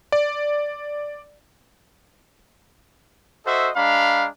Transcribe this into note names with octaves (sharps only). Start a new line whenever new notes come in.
D5
F#4 A4 C5 D#5 E5
G#3 D4 F5 A#5 B5